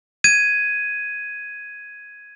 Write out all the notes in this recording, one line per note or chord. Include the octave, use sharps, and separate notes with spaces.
G#6 D#7